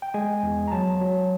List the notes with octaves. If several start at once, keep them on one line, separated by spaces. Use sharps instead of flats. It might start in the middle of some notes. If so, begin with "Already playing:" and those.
G5
G#3 G#5
E2
A#5
F#3 A5
F#3